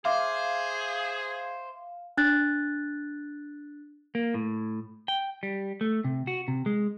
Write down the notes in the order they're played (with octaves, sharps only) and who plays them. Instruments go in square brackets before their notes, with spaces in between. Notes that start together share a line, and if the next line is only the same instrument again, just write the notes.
[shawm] G#4 [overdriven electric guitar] C5 [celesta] E5 D6 [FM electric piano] F5
[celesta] D4 F#6 A6
[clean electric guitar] A#3
A2
G5
G3
A3
C3
F#4
C3
G#3